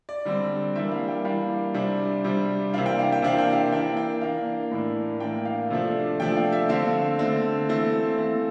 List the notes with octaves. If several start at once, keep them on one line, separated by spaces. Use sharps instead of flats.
D5
D3 G3 C4
E3 G3 A#3 D4 E5
F5
G5
E3 G3 A#3 D4 F5
C3 G3 D4
C3 G3 D4
C3 E3 A#3 D4 F5
G5
F5
G5
C3 E3 A#3 D4 F5
G5
F5
E3 A#3 D4 G5
G5
E3 A#3 D4 F5
A2 E3 A#3 D4
A2 E3 A#3 D4 G5
F5
C3 F3 A3 D4
C3 F3 A3 D4 G5
F5
E5
D3 A3 C4 F5
D3 A3 C4
E3 A3 C4
E3 A3 C4